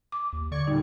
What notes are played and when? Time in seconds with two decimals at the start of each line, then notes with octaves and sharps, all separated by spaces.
0.12 D6
0.33 D#2
0.51 D3 D5 C#6 G#6
0.67 A#2 G3 D#4